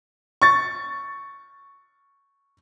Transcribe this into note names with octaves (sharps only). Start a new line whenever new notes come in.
C#6 A6